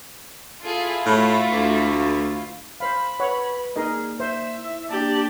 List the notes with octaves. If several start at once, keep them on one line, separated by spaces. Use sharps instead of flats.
E4 F4 G#4 A4
A2 A3 F#4
D2
C5 F5 B5
B4 C#5 F#5
A#3 D#4 G#4 A#4 D5 D#5
C5 E5
E4 E6
A#3 D4 G4 D5 A5